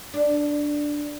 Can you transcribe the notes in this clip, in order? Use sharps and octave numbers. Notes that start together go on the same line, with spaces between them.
D4